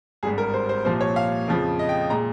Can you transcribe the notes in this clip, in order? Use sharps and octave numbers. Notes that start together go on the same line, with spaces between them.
G#1 G2 G3 G#4
A#4
C5
C5
C2 A#2 F3 C5
C#5
F5
F2 C#3 F3
D#5
G5
A#2 G#3 A#5